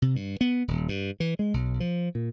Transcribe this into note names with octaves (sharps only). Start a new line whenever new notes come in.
C3
G2
B3
D#1
G2
E3
G#3
B1
F3
A#2